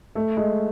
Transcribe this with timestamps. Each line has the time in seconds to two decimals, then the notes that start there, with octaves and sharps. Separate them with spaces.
0.15 A3
0.37 G#3